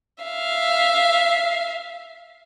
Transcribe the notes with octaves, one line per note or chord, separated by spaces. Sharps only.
E5 F5